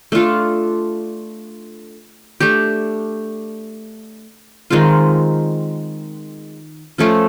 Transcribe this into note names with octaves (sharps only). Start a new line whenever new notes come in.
A3 D4 F4 A4
A3 D4 G4
D#3 G#3 C4 F4
F3 A3 C#4 F4